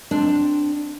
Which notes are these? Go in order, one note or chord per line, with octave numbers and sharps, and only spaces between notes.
C4 D4